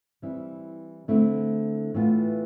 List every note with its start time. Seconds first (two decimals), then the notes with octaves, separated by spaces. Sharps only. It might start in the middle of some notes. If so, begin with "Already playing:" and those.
0.22 E3 G3 C4 E4
1.08 D3 A3 C4 E4
1.94 A2 E3 B3 F4